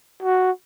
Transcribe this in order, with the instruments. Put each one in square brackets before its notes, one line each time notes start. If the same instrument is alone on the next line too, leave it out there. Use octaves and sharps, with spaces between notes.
[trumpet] F#4